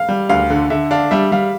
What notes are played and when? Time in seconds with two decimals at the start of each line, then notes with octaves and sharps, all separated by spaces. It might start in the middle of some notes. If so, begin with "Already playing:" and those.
Already playing: F5
0.09 G3
0.29 D2 F5
0.50 D3
0.70 D3 E5
0.91 D4 F5
1.11 G3 E5
1.32 G3 F5